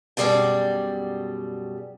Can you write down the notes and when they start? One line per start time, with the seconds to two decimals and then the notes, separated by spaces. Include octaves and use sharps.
0.17 F#2 B2 G3 G#4 D5 G5